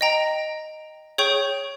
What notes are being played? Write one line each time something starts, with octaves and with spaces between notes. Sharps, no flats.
D#5 G5 A#5
G#4 C#5 G5 C#6 G6